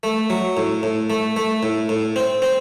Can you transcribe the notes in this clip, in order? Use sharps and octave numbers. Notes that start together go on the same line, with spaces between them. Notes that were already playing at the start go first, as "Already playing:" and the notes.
A3
F#3
A2
A2
A3
A3
A2
A2
C4
C4